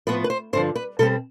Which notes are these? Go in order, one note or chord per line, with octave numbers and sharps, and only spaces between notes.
A2 F3 B3 B4
B4
C5
G2 D3 F3 C5
B4
B2 G3 C4 A4